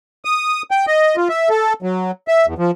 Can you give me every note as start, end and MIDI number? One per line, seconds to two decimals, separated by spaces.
0.25 0.62 87
0.71 0.86 79
0.87 1.16 75
1.17 1.28 65
1.29 1.49 76
1.50 1.73 69
1.82 2.11 54
2.28 2.46 76
2.47 2.54 40
2.58 2.71 53